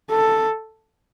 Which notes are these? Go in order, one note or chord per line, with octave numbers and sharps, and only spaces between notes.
A4